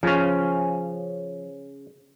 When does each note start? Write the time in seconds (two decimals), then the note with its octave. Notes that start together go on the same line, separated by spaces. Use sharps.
0.03 C#3 F3 C#4